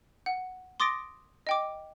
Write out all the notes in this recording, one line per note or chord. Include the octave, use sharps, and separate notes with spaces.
F#5
C6 D6 D#6 A6 A#6 D7
D#5 G5 D6